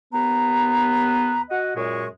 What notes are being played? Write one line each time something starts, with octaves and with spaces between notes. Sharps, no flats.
D#2 B3 B4 A#5
F#4 D#5 F#5
F#2 A#2 G#3 C#6